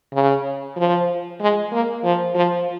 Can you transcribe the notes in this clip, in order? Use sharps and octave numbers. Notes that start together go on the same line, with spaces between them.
C#3
F3
G#3
A#3
F3
F3